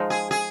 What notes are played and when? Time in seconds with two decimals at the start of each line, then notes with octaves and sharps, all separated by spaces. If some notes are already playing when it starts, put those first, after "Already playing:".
Already playing: F3 G#3 D#4
0.10 G#4
0.31 G#4